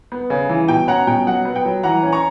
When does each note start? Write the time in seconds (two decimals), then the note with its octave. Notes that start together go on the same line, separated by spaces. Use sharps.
0.12 B3
0.30 C#3
0.49 E3
0.68 B2 G5
0.88 C#4 F#5 A#5
1.07 B2 G5
1.27 F#3 F#5
1.45 B3
1.56 G5
1.65 F#3
1.83 E3 F#5 A#5
2.03 C#4
2.12 A#5 C#6